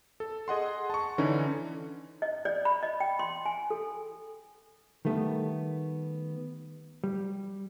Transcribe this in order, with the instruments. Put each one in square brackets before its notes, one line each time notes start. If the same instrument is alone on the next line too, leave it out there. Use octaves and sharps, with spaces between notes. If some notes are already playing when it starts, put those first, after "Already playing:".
[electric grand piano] A4
G#4 D#5 F#5 C6
A5 C#6
D3 E3 C#4 D#4
[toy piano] D#5
D5
B5
D#5
G5
C6
G#5
A4
[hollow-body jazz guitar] D#3 G3 A3 B3
G3